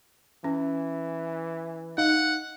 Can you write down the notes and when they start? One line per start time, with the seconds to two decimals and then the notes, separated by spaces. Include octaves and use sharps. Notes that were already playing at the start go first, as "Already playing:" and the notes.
0.44 E3 C#4
1.98 D#4 F5 F#5